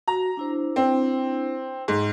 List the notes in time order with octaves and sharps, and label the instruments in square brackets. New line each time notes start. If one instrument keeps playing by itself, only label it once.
[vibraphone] F#4 [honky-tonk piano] A#5
[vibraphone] D4 E4 C5
[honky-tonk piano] C4
G#2